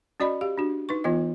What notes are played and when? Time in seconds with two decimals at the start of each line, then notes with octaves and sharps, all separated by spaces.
0.20 C#4 F#4 D5 D#5 B5
0.41 G4 F5
0.58 D4 F#4
0.89 D#4 B4 C#6
1.04 E3 B3 F4 D#5